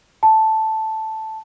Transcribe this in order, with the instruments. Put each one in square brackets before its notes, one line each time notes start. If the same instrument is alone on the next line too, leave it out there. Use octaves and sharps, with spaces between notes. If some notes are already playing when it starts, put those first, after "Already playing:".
[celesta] A5